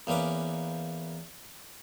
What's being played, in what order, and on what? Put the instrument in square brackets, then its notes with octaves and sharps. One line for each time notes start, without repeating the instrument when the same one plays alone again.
[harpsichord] E2 A#3 C#4 B4 D6